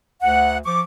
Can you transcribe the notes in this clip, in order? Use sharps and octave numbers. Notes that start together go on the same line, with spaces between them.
D2 F#5
F3 C#6 D6